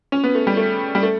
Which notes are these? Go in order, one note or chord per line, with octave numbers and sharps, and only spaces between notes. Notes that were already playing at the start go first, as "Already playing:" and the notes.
C#4
B3
A3
G3
A3
G3
A3